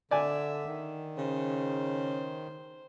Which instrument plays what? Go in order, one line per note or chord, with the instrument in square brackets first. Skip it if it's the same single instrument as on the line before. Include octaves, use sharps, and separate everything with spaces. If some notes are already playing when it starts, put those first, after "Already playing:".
[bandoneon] D3 [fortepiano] D5 G#5 [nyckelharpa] E5
[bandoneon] D#3
[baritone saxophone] C#3 [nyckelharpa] C5